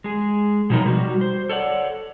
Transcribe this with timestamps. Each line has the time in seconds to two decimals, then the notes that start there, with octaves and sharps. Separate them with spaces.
0.04 G#3 G#4
0.70 B2 F3 F#3 C4 D#4 A#4
0.86 G3 F#4
1.21 C5
1.49 A4 C#5 D5 F#5